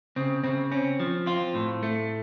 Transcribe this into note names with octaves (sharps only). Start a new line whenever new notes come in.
C#3 C4
C#3 C4
C4 C#4
F3
C4 F4
A2
A3